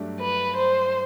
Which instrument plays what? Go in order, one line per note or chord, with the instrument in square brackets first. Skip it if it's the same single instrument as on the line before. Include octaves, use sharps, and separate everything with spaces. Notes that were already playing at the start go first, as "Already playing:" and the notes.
Already playing: [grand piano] G2 F#3 A3 D4 G4
[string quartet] B4
C5